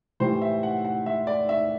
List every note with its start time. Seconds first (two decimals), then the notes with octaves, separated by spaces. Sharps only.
0.20 A2 E3 G3 C5
0.42 E5
0.63 F#5
0.85 F#5
1.06 E5
1.27 D5
1.49 E5